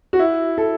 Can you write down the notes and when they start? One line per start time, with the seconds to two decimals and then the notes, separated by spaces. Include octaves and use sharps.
0.13 F#4
0.19 E4
0.58 A4